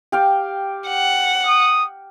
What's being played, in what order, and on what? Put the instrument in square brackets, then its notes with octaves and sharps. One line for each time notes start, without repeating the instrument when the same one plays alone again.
[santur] G4 F5 G5
[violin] F#5
[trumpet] D#6